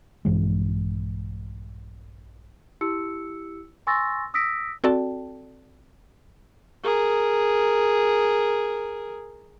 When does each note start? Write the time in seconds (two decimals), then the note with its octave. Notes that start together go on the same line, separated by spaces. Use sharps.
0.25 A#1 G2 E3 G#3
2.81 E4 G4 E6 C#7
3.87 G#5 C6 C#6 E6 A6 A#6
4.34 D#6 E6 A#6 B6 D7
4.84 C4 F#4 A4 D5 G5 A5
6.84 G#4 A#4